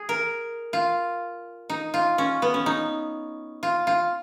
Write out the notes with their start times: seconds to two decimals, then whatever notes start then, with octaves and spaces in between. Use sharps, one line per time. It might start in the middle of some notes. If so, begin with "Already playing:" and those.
Already playing: G#4
0.09 A#4
0.73 F4
1.70 D#4
1.94 F4
2.18 C#4
2.42 B3
2.54 C#4
2.66 D#4
3.63 F4
3.87 F4